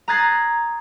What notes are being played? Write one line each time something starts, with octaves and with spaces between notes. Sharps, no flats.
A#5 D#6 F#6 G#6 A6 C7